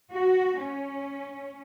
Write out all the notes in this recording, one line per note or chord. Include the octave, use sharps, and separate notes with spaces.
F#4
C#4